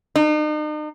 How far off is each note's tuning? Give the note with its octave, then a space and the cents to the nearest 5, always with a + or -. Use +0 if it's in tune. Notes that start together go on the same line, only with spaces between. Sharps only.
D#4 -40